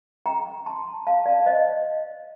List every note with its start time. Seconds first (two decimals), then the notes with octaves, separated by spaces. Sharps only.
0.26 G5 A#5
0.66 A5 C6
1.07 F5 A5
1.26 D5 F5
1.39 F5
1.46 C5 D#5